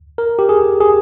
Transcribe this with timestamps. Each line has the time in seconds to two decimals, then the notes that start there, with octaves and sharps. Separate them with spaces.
0.18 A#4
0.39 G4
0.49 G#4
0.80 G#4